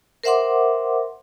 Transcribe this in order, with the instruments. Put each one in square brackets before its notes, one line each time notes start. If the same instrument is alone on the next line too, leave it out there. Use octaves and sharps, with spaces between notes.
[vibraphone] A#4 C5 E5 F#5 C6 D6